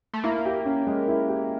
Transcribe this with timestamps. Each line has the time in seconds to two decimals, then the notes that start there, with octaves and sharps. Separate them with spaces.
0.14 A3
0.23 A#3 E4
0.45 G4
0.65 C#4
0.87 G#3
1.08 E4
1.28 G4